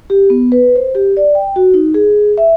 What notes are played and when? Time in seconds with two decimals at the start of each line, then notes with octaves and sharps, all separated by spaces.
0.10 G4
0.30 B3
0.52 B4
0.76 C5
0.95 G4
1.17 D5
1.35 G5
1.56 F#4
1.74 D#4
1.94 G#4
2.38 E5